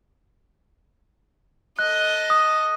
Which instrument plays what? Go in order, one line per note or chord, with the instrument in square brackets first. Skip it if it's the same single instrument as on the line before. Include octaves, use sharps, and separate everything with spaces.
[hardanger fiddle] A4 D#5 [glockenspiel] F#6
[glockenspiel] D#6